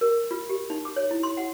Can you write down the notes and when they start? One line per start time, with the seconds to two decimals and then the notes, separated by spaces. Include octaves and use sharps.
0.01 A#4
0.31 F4
0.50 G4
0.70 D#4
0.85 D6
0.96 C#5
1.11 E4
1.23 C6
1.37 F#5